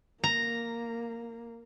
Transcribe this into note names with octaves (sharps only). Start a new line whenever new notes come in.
A#3 A#5